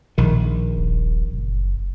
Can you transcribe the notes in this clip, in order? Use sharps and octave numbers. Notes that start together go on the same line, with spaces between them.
A#1 D#3
D#1
F#1